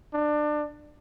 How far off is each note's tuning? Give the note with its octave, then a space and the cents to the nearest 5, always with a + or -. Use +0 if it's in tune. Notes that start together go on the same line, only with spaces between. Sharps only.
D4 +25